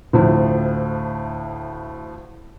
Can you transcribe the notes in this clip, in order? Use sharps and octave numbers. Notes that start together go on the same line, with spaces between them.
D2 A2 F3